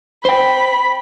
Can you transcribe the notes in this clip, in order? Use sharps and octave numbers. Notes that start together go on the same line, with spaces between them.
C5 G5 B5